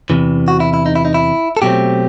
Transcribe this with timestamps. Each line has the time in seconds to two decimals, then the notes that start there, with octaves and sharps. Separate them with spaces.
0.10 E2 C3 E3
0.48 F#4
0.60 E4
0.74 E4
0.86 D#4
0.95 E4
1.05 D#4
1.14 E4
1.57 A4
1.62 B2 F#3 A3 C4 G4